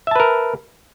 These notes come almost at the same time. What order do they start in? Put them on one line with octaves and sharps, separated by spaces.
E5 A5 B4 A#4